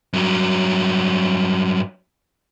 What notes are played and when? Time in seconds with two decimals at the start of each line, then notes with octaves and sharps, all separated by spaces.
0.13 G2 F#3